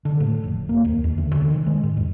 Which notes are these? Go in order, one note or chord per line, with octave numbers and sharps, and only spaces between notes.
D3
A2
F1
A#3
D#2
E2
D2
D3
D#3
G#3
G#2
E2